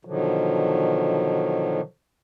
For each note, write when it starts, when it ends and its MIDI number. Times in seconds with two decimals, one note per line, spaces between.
0.05 1.81 47
0.05 1.81 50
0.05 1.81 51
0.05 1.81 53
0.05 1.81 54